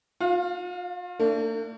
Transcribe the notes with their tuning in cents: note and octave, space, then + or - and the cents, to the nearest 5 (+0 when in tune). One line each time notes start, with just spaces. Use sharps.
F4 +40 F5 +0
A3 +45 D4 +0